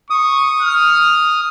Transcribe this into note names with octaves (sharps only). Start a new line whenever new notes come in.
C#6 D#6
F6